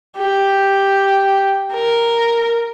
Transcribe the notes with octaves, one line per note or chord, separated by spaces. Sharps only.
G4
A#4